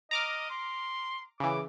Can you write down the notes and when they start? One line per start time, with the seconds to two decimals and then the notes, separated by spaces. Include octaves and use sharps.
0.11 D#5 A#5 D6 F6
0.50 C6
1.40 C#3 E3 D6